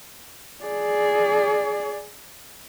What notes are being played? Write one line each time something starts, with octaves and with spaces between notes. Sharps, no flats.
G#4 D5